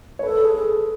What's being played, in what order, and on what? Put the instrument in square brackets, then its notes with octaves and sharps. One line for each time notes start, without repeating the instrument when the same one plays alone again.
[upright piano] C#5
[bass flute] A4 [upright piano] B4
[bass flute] G#4
[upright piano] A4